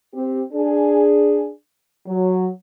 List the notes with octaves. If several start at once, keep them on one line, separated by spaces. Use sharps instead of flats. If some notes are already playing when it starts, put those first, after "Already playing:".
C4 G4
D4 G#4
F#3